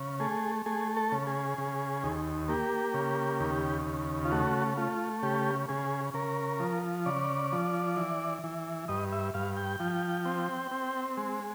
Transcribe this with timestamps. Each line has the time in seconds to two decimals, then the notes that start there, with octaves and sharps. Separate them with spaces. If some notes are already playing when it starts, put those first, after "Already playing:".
Already playing: C#3
0.20 A3 G#4
0.66 A3 G#4
0.97 A4
1.12 C#3
1.27 G#4
1.58 C#3
2.03 D#2
2.49 A#3 G4
2.94 C#3
3.40 D#2
3.86 C#3
4.25 F4
4.32 A3 F#4
4.77 A3 F4
5.23 C#3 G4
5.69 C#3 G#4
6.14 C#3 A#4
6.60 F3
7.06 C#3 D5
7.52 F3
7.97 E3
8.44 E3
8.88 G2 D#5
9.12 E5
9.34 G2 F5
9.57 G5
9.80 F3
10.25 C4
10.71 C4
11.17 G#3